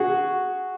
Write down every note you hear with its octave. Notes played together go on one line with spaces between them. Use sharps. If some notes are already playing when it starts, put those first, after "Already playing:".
Already playing: F#4 G#4